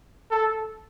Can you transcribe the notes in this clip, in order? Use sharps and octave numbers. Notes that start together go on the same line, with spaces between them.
A4